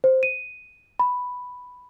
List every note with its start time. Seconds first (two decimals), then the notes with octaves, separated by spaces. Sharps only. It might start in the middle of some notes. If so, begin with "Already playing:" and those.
0.04 C5
0.23 D#7
1.00 B5